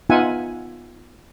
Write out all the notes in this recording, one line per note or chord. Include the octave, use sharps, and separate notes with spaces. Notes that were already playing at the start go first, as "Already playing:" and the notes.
B3 D#4 F4 E5 F#5 G#5